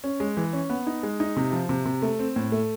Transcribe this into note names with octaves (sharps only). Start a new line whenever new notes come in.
C#4
G#3
E3
C#4
B3
D#4
G#3
D#4
C3
F3
C3
C3
A3
C4
A2
A3